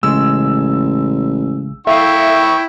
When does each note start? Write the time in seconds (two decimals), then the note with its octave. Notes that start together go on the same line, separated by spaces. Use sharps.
0.03 A1 C#3 G#3 E6
1.87 E4 A4 E5 F5 G5 C#6